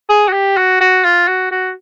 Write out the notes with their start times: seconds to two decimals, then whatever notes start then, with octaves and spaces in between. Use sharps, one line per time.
0.09 G#4
0.28 F#4
0.33 G4
0.57 F#4
0.81 F#4
1.05 F4
1.28 F#4
1.51 F#4